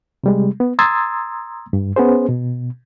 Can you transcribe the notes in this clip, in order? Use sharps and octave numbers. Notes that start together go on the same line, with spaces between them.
C3 G3 G#3
B3
A#5 C6 D#6 E6 G#6 A6
G2
B3 C#4 G#4 C5
B2